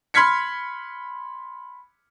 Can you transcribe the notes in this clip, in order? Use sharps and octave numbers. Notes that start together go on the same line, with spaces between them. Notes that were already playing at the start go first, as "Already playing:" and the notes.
B5 C6 F6 G#6 B6 C#7